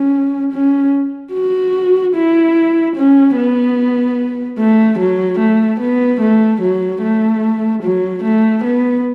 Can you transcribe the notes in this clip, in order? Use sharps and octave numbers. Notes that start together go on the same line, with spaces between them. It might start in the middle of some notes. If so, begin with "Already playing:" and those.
Already playing: C#4
C#4
F#4
E4
C#4
B3
A3
F#3
A3
B3
A3
F#3
A3
F#3
A3
B3